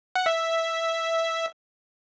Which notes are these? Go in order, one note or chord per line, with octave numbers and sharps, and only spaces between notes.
F#5
E5